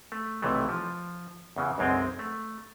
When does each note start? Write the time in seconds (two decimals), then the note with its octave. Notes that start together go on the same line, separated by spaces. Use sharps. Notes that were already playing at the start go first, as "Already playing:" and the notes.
0.12 A3
0.42 B1 C3 E3 F#3 A3
0.69 F3
1.56 E2 C#3 E3
1.78 B1 F#2 G#3 C4
2.19 A3